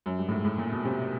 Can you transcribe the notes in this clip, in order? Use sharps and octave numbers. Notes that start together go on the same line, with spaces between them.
F#2
G2
A2
G#2
A2
A#2
B2
C3